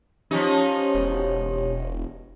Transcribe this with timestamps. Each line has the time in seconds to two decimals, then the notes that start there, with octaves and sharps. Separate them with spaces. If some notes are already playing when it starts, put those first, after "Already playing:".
0.31 F3 C#4 D#4 G4 C#5
0.95 E1